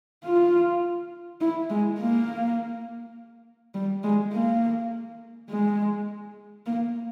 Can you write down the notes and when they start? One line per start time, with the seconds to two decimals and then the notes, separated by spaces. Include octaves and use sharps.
0.24 F4
1.41 E4
1.70 G#3
1.99 A#3
3.74 G3
4.03 G#3
4.33 A#3
5.49 G#3
6.66 A#3